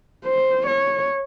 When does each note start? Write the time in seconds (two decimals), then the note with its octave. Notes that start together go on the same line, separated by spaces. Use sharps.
0.25 C5
0.67 C#5